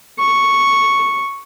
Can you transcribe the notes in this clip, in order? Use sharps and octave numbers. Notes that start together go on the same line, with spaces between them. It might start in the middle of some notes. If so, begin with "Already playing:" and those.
C#6